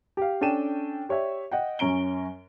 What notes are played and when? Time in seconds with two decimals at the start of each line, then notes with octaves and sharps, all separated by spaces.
0.17 G4 F5
0.41 C#4 D4 A4 G5 D#7 E7
1.09 G4 C#5 D5 E5
1.52 D#5 F#5 G5
1.79 F#2 C#4 A#5 D7 G7